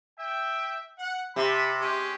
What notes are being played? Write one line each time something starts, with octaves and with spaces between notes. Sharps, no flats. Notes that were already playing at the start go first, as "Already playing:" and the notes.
E5 G5
F#5
C3 A5 B5
G#3 C#4 G4